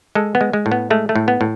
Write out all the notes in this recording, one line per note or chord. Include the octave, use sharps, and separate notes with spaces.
G#3 A4
B3
G#3
G#3
A2
B3
G#3 A3
A3
A2
B3
A2